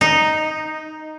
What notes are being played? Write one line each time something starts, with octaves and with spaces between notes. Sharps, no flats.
D#4